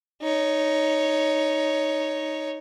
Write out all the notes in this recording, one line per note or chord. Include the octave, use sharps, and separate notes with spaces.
D#4 C#5